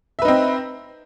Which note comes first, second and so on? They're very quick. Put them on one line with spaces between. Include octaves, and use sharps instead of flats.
E5 B4 D#4 C4